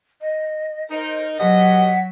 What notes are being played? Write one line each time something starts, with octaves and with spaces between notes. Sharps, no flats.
D#5
D#4 A#4 C5
B2 F#3 G4 D#5 F#5 B6